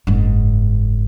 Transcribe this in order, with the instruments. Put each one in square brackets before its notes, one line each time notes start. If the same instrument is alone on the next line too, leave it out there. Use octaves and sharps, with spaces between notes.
[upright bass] F#1 G#2